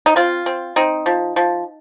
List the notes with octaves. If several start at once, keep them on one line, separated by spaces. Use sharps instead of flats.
D#4
C4 F4
C4
C4 D#4
F3
F3